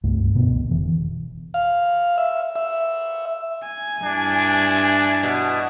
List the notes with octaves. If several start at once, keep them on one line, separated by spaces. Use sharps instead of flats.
C#2 G2 A3
F#1 B2 D3 B3
F1 E3
F5
E5
E5
G#5
G2 D4 E4
B2